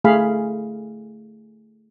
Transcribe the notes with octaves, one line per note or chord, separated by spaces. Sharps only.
A3 G#4 F5 B5